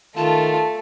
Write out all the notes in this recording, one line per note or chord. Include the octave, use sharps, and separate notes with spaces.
D#3 A3 F4 A5